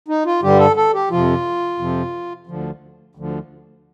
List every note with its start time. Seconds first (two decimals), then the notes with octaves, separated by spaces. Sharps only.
0.08 D#4
0.25 F4
0.42 G2 D3 G3 G4
0.59 A4
0.76 A4
0.94 G4
1.10 F2 C3 F3 F4
1.79 F2 C3 F3
2.47 D2 D3 F3
3.15 D2 D3 F3